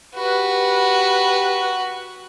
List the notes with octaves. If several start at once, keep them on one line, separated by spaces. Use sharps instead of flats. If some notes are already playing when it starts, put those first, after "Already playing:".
F#4 G4 B4